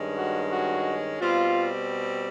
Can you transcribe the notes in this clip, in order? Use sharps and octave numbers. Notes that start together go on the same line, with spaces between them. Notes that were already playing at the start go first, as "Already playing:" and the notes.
Already playing: G2 D#3 G#3 C#4
F#4
F#4
B2 G3 C4 F4